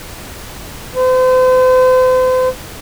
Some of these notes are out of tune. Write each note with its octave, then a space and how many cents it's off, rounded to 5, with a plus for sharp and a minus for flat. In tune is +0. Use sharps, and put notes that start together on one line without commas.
C5 -40